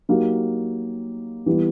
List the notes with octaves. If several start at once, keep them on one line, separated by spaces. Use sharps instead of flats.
F#3 A#3 D#4 G4
E3 G3 B3 E4